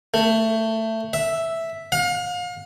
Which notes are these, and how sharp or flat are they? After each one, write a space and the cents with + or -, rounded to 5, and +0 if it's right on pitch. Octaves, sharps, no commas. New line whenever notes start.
A3 +20
E5 +0
F5 +35